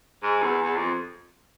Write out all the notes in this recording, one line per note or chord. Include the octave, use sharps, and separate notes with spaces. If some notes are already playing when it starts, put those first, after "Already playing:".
G#2
E2
E2
F2